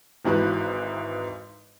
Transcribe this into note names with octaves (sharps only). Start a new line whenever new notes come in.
G#1 G#2 E3 F#4 B4